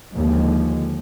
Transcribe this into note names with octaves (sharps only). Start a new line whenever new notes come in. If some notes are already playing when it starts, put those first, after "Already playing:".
D#2 D3 F3 G#3